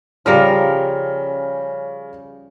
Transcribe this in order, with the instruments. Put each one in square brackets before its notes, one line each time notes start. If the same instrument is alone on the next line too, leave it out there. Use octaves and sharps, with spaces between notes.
[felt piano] C#3 F6 [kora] F3 G3 A#4 [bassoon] C#4